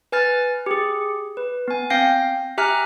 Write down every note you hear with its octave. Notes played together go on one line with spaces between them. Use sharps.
B4 G#5 F6 A6
G4 G#4
B4
B3 G#5
C4 F5 G5 G6 A#6 C7
G4 E5 G#5 A#5 F6 F#6